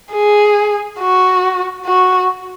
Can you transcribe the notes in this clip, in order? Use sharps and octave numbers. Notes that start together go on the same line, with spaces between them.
G#4
F#4
F#4